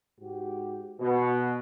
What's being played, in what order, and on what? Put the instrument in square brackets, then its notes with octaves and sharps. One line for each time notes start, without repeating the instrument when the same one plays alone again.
[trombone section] G#2 F#4 G4
[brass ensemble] B2 [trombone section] F#4